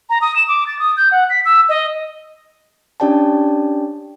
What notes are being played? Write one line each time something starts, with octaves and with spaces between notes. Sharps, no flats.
A#5
D#6
E7
D6
A6
D#6
G6
F#5
B6
E6
D#5
C#4 D4 G4 D5 G5 A5